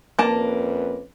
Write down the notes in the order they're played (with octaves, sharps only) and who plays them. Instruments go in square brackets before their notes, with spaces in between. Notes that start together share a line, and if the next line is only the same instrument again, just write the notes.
[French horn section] F2 C#4 B4 [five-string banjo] A#3 A5